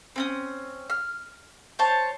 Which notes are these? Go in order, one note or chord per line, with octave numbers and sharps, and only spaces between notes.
C4 C#4 D#6
F6
C5 C#5 A5